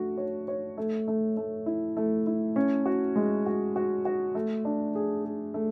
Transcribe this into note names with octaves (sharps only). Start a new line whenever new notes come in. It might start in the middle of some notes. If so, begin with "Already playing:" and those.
Already playing: A3 D4 F#4
C#5
C#5
A3
A3
A3
E4
A3
E4
C#4
F#4
G#3
F#4
F#4
F#4
A3
D4
G#4
G#4
A3